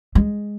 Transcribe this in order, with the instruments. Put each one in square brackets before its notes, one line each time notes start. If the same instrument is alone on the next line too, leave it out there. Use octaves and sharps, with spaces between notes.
[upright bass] G#3